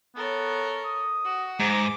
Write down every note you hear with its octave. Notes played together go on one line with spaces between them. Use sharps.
B3 A4 A#4 C#5
D#6
F#4
G#2 A#5 D6